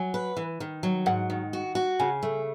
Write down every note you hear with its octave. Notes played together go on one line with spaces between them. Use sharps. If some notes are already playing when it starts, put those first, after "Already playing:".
Already playing: F#3 G#5
B4
E3
D#3
F#3
G#2 F#5
D#3
F#4
F#4
C#3 G#5
A3